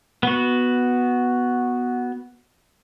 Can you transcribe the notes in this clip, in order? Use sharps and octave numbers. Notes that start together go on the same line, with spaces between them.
B3 F#4